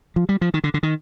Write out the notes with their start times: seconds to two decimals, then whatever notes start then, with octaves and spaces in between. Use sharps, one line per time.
0.16 F3
0.29 G3
0.41 F3
0.54 D#3
0.64 D3
0.74 D3
0.83 D#3